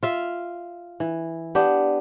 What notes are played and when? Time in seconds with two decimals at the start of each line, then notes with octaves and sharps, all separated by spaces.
0.03 F4 E5 F5
1.00 E3
1.55 B3 D4 G4